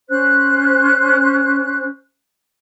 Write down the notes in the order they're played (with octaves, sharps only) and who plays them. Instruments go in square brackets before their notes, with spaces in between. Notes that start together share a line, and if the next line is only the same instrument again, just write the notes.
[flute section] C#4 C5 F#6